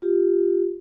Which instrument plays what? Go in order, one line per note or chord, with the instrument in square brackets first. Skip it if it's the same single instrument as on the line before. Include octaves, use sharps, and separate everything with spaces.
[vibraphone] F4 G4